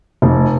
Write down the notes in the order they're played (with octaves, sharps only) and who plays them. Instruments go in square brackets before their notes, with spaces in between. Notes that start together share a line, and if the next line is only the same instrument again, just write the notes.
[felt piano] F1